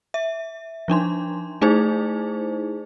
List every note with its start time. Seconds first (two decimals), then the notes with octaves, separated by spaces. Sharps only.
0.14 E5
0.88 F3 D4 D#4 C6
1.61 A3 D#4 E4 G#4 C5